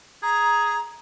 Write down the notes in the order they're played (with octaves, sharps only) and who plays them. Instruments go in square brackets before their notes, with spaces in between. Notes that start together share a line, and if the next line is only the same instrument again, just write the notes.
[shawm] G#4 [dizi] A#5